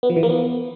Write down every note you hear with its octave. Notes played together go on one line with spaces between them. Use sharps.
B3
F3
E3
A#3
B3